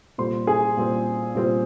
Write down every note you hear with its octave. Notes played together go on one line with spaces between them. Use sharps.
A#2 G3 C4 F4 C5 C6
G#4 G#5
A#2 G3 C4 F4
A#2 G3 C4 F4